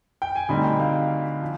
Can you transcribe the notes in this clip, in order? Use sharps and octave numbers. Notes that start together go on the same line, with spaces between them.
G5
G#5
D2 D3 G3 C4 D#4 B5
G5
F5
F3